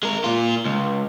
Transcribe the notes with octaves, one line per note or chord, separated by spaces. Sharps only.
G#3 A#4
A#2 F4
C#2